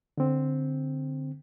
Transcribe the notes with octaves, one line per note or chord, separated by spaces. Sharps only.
D3 C4